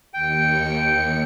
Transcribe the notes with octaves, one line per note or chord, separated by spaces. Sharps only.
D#2 G5 C#7